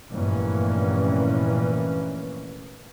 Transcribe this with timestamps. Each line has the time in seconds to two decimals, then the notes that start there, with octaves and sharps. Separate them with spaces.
0.12 F1 G2 A#2 E3 A#3 C#4